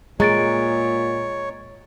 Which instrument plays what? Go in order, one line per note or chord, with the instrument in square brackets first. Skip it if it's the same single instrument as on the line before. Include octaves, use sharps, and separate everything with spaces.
[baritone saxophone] A#2 [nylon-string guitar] G#3 [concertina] C#5 [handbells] A#5 A6 D7